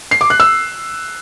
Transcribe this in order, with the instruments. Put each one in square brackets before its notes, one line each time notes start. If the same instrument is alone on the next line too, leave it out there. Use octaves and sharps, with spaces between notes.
[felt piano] C7
D6
F#6
E6